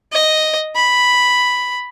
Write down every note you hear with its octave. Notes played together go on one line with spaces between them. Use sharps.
D#5
B5